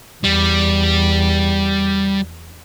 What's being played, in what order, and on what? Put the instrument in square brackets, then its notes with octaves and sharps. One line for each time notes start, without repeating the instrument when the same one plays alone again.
[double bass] E2 [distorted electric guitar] G3